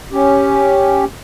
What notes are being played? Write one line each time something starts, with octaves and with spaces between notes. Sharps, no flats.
C#4 G4